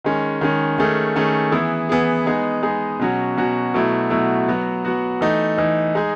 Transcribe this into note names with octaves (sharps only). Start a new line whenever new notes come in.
D#3 G#3 C#4
D#3 G#3 C#4
D#3 A3 C#4 G#4
D#3 A3 C#4 G#4
E3 B3 E4 G#4
E3 B3 E4 G#4
G#3 B3 D#4 G#4
G#3 B3 D#4 G#4
B2 F#3 C#4 F#4
B2 F#3 C#4 F#4
B2 F#3 A3 E4
B2 F#3 A3 E4
F#3 B3 F#4
F#3 B3 F#4
E3 A3 D#4
E3 A3 D#4
G#3 D#4 G#4